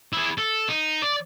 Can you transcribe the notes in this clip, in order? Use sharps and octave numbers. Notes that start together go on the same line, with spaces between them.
E4 G#4
A4
D#4
D5